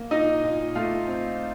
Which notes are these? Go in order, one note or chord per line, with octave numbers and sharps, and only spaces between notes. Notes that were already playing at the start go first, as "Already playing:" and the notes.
Already playing: A#3
A#2 D#4 D#5
A#2
A3 F4 F5
C4